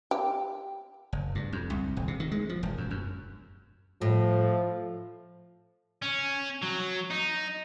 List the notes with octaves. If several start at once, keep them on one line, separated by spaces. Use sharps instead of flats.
G4
F#1
G2
F2
C2
D#1
C3
D#3
G#3
F3
E1
F#2
F#2
A2 F3
C#4
F#3
D#4